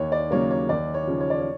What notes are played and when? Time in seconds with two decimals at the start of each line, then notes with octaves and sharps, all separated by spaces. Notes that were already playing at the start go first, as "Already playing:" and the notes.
Already playing: D#2 C#5
0.12 D5
0.31 C#3 F#3 A#3 C#5
0.51 C#5
0.69 D#2 D5
0.94 C#5
1.07 C#3 F3
1.20 C#5
1.30 D5
1.39 C#5